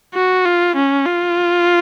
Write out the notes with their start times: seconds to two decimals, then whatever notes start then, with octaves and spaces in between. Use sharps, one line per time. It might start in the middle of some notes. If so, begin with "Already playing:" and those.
0.15 F#4
0.45 F4
0.76 C#4
1.06 F4